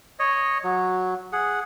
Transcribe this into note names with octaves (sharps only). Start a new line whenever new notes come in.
C#5 D#5
F#3
G#4 F#5